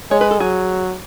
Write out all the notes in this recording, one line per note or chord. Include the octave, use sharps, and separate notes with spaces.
G#3 C#5
B4
A4
F#3 G#4